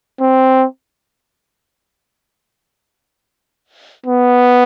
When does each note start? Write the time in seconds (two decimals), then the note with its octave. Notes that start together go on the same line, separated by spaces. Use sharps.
0.21 C4
4.06 B3